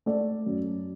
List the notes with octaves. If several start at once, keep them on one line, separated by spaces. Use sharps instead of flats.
A3 D5
F#2